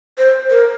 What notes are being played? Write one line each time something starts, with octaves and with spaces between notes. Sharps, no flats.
C5
A#4